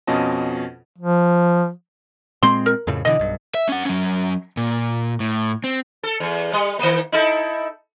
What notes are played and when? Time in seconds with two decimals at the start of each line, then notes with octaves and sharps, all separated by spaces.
0.07 F2 B2 C#4 F4 D#5 A5
0.98 F3
2.43 A#2 G#3 C4 C6
2.66 A#4
2.87 F2 A2 C#3
3.05 B2 D3 E3 D#5
3.19 B1 G2
3.55 E5
3.69 C#4 F#5
3.85 F#3 C#4
4.57 A#2
5.20 A2
5.64 C4
6.03 A4
6.20 E2
6.53 G3
6.79 D#3 A#3
7.12 D#4 E4 A4